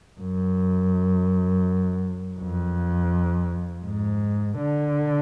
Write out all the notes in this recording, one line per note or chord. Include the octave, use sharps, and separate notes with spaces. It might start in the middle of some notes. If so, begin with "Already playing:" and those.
F#2
F2
G#2
D3